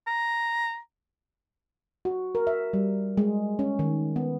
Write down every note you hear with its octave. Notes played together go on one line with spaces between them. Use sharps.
A#5
F#4
A#4
E5
G3
G#3
C#4
D#3
B3